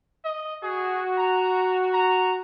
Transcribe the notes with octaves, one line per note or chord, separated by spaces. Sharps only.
D#5
F#4 G#4
A#5
A#5